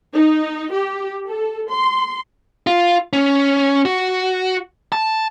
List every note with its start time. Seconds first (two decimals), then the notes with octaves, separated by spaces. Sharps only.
0.14 D#4
0.72 G4
1.28 A4
1.70 C6
2.67 F4
3.13 C#4
3.85 F#4
4.92 A5